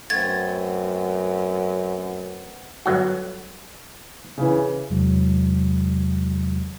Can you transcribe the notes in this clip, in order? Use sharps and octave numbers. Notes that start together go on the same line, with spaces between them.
F#2 A3 B3 C4 G#6 A6
G1 F#3 F#4
C#3 E3
E2 C3 E3 F#3 G#3